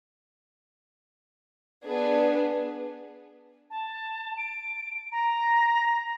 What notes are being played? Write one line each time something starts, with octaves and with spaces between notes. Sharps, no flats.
B3 D4 G#4 B4
A5
D7
A#5